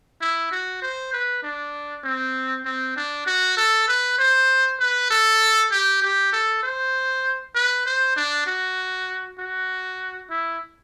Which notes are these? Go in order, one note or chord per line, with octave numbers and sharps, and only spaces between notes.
E4
F#4
C5
B4
D4
C4
C4
D4
F#4
A4
B4
C5
B4
A4
G4
G4
A4
C5
B4
C5
D4
F#4
F#4
E4